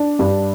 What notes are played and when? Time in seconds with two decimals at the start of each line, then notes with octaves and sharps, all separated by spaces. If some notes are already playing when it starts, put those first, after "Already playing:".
Already playing: D4
0.19 G2